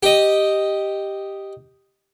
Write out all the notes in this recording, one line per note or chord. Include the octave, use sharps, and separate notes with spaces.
G4 D#5